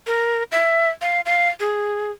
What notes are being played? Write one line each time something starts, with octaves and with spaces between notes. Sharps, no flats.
A#4
E5
F5
F5
G#4